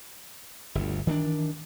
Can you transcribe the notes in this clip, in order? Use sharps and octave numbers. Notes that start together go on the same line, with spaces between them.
G1 D2
D#3 E3 C#4 D4